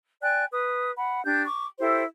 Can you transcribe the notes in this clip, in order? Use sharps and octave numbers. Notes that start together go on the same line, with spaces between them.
D5 G5 G#5 F#6
B4 D#6
F#5 B5
D4 G4 G6
C#6 D6
E4 G4 A4 C5